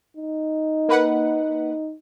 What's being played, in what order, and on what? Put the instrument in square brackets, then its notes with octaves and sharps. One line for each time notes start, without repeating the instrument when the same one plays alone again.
[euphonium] D#4
[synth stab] A#3 B4 F#5